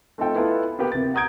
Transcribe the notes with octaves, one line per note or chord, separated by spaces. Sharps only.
A3 C4 D#4 F4 A4 G5
B3 E4 F4 A4 B4
A#3 B3 G4
C3 A6
F#5 A#5 D#6 G6 G#6 D7